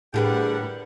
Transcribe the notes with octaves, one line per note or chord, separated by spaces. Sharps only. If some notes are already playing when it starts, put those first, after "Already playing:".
A2 D3 G3 G4 G#4 A#4 B4 F#5